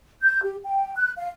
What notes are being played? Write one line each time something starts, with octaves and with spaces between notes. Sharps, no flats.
G6
G4
G5
F#6
F5